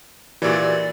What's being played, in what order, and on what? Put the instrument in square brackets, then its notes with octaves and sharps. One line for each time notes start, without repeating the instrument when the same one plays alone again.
[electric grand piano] A#2 E3 [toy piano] F#4 G4 A#4 [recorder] D5